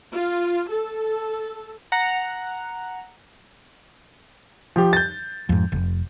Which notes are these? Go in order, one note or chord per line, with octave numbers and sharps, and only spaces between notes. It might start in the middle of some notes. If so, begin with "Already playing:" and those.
F4
A4
F#5 A#5
F3 G4
G6 A6
F2 G#2
F1